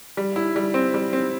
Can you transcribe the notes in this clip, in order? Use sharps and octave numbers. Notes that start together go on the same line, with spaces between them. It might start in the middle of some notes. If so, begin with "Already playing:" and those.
G3
E4
G3
C4
G3
C4